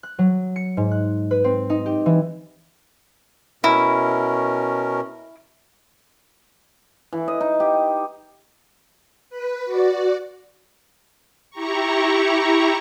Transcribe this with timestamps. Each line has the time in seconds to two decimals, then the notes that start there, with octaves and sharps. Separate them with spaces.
0.03 F#6
0.19 F#3
0.56 C#7
0.77 G#2
0.91 F#6
1.31 B4
1.44 C4
1.70 D#4
1.86 G4
2.06 E3
3.64 B2 C#4 E4 A#4
7.13 E3
7.28 D#5
7.41 D#4
7.60 G4
9.30 B4
9.65 F#4 D5
11.50 E4 G4 A#5 C#6